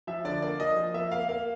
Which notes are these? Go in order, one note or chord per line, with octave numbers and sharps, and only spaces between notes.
F3 E5
D3 D5
A#3 D5
F3 D#5
F3
A#3 E5
A#3 F5
A#3 F5